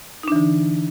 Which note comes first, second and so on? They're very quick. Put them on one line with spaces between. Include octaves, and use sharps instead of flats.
D#4 D4 E3 D3